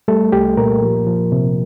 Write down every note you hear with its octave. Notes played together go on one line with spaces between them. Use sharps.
G3 A3 A4
C2 G4
A#2 A#3 A#4
F3
F3
C3